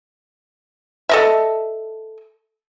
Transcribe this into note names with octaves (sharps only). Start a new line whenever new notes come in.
A4 D#5 E5